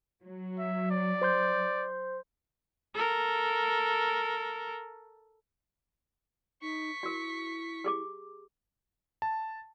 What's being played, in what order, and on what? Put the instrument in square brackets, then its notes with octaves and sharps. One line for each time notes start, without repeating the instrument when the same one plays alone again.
[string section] F#3
[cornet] E5
D5
[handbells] C5 C6 G6
[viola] A4 A#4
[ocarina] D#4 [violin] C#6 B6
[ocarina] E4 [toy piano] F#4 A#4
[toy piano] G4 G#4 D6
[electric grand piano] A5